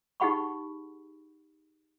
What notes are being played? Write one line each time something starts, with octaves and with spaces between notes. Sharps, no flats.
D#4 G4 G#4 F#5 B5 C#6